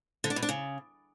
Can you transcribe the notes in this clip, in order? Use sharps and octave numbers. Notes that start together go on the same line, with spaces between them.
D3
D4
B2
D4
C#3